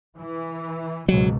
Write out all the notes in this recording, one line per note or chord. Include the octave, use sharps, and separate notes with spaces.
E3
C#2 G#2 B2 F#3